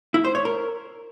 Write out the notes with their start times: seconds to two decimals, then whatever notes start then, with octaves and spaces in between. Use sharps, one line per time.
0.14 E4
0.25 C5
0.35 C#5
0.45 A#4